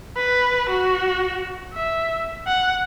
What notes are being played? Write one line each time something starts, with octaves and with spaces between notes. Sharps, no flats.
B4
F#4
E5
F#5